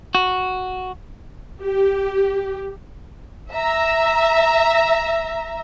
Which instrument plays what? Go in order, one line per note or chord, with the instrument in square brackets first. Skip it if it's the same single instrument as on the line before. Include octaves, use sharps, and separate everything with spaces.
[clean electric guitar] F#4
[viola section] G4
[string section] E5 A#5